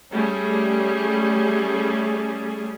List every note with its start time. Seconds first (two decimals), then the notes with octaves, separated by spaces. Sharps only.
0.14 G3 A3 C#4 G#4